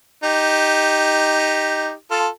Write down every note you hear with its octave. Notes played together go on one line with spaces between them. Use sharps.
D#4 G4
F4 A4